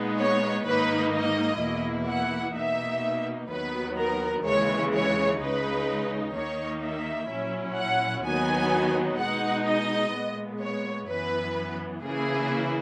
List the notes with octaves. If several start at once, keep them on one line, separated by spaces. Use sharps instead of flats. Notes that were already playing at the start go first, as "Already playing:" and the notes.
Already playing: A#2 G#3 B3 D#4
C#5
G#2 D#3 A#3 D#4 B4
D#5
E2 B2 A#3 E4
F#5
B2 A#3 D#4 E5
D#2 D#3 F#3 B3 B4
A#4
D#2 C#3 E3 G#3 C#5
C#5
C#2 C#3 G#3 D#4 B4
D#2 D#3 A#3 D#4 C#5
E5
A#2 F#3 C#4 E4
F#5
D#2 D#3 F#3 B3 D#4 G#5
B2 G#3 D#4 F#5
D#5
A#2 G#3 B3
C#5
F#2 E3 B3 B4
C#3 E3 A#3 E4 G#4